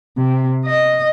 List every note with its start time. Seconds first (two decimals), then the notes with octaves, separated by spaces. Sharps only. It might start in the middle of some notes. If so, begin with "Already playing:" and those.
0.18 C3
0.66 D#5